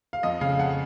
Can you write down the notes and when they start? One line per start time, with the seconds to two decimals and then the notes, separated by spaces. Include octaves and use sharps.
0.13 F5
0.23 F2 D#5
0.41 C#3 F5
0.59 F2 F#5